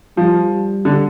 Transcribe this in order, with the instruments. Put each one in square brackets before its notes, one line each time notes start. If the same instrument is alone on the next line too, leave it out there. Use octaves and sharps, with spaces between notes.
[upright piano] F3 [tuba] G3
[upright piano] D3